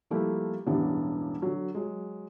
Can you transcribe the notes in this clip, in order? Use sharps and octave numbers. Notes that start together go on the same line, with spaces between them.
F3 G3 A3 A#3 E4 G4
E1 A1 G2 E3 D4
D3 F#3
F#3 G#3